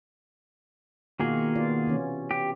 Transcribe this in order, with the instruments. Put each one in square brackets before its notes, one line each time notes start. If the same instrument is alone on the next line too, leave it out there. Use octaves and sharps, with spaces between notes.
[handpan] B2 F4 F#4 [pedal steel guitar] D#3 A#3 G#4
[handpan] B3 F4 D5
C3 E3 C#4
[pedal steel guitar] G4